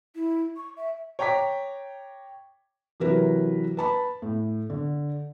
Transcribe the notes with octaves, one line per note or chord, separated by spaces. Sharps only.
E4
C#6
E5
C#5 G5 A#5 D6 B6
C3 E3 F#3 E4 A#4 B4
B4 A5 B5
A2
D3